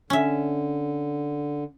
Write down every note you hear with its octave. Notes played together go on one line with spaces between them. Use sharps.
D3 C#4 E5